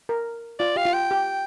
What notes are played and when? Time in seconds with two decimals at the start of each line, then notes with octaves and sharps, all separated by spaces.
0.09 A#4
0.59 F4 D5
0.76 G4 F5
0.85 F4
0.93 G5
1.11 G4